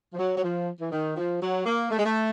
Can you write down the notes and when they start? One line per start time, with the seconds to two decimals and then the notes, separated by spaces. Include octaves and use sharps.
0.13 F3
0.18 F#3
0.36 F#3
0.42 F3
0.80 E3
0.91 D#3
1.17 F3
1.41 F#3
1.65 A#3
1.90 A3
1.97 G#3
2.05 A3